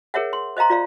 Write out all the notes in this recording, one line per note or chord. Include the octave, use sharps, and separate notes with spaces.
G#4 A#4 C#5 E5 F#5
C6
C5 D#5 F5 A#5 C6
F4 D5 F5